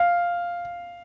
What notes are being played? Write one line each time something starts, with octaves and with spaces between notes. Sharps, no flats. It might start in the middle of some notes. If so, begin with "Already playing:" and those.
Already playing: F5